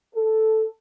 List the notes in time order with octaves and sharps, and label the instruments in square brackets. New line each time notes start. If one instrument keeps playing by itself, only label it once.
[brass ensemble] A4